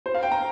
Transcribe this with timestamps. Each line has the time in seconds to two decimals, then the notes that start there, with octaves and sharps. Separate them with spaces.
0.06 C5
0.14 F5
0.23 G5
0.32 A#5